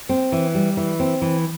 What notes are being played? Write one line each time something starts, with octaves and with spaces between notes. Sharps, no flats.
C4
E3
G3
E3
C4
E3